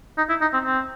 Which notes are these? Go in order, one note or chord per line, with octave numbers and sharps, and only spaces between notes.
D#4
E4
D#4
C4
C4